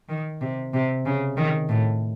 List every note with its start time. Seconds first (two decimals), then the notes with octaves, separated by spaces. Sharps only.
0.09 D#3
0.41 C3
0.74 C3
1.06 C#3
1.37 D#3
1.69 A2